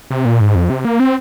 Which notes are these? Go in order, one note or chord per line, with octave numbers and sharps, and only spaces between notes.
C3
A#2
G#2
F2
C3
A#3
C4